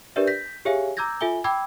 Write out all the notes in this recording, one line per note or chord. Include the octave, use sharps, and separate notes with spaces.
D4 G4 A#4 B4 D5 E5
G6 A#6 B6
G4 G#4 C#5 E5 F5 G#5
A#5 D6 E6 G6 G#6 A#6
F4 A4 E5 G#5 G7
G5 B5 D6 E6 G#6